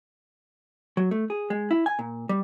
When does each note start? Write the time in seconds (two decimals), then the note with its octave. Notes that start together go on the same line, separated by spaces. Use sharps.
0.97 F#3
1.11 A3
1.30 G#4
1.50 G#3
1.71 E4
1.86 G#5
1.99 A#2
2.29 G3